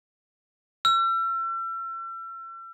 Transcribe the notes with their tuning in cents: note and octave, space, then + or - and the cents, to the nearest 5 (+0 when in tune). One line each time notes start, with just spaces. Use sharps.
E6 +40